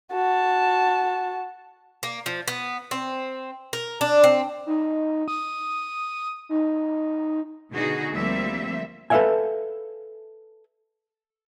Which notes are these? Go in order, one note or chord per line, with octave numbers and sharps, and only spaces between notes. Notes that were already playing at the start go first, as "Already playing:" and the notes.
F#4 A5
A#3
F3
B3
C4
A#4
D4
C4
D#4
D#6
D#4
B2 D3 D#4 F#4 G#4
D2 F3 G3 A#3 C4 E5
A4 B4 C#5 E5 F5 G#5